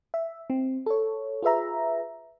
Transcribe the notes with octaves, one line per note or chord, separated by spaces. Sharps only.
E5
C4
A4 C#5
F4 G#4 B4 E5 A#5